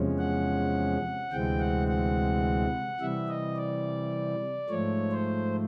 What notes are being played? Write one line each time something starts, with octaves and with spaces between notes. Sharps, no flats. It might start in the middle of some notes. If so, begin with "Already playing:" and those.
Already playing: E2 C3 F3 G#3 C#4
F#5
D2 C3 E3 G#3 C4 G5
F#5
F#5
C3 E3 G3 E5
D#5
D5
G#2 F3 A3 C#5
C5